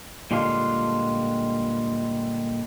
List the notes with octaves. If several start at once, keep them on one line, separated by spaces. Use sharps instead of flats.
A#2 D3 G3 G#3 D4 F4